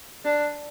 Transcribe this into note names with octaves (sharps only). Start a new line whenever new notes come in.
D4